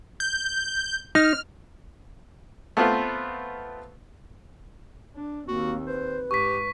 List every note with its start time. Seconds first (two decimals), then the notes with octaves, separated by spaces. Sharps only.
0.20 G6
1.15 D#4 F6
2.77 A3 B3 C4 F4 B4
5.15 D4
5.48 D#2 A#3 C4 F#4
5.87 B4 C5
6.31 G#2 G4 C#6 B6